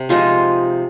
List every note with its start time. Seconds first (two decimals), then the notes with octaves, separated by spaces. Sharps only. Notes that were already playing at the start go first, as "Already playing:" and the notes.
Already playing: C3
0.09 F3 G#3 D#4 F4